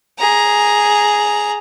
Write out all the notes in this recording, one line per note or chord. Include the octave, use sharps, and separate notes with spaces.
G#4 A#5